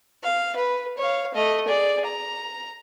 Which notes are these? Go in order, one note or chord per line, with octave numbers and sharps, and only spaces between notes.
F5
B4
C#5 F5
A3 D#5
G#4 D5
A#5